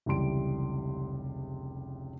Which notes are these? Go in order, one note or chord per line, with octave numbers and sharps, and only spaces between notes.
F1 C#2 E3 G3 C6 D7